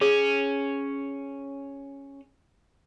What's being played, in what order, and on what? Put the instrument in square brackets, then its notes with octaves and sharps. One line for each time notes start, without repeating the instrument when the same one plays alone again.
[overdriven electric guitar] C#4 [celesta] G#4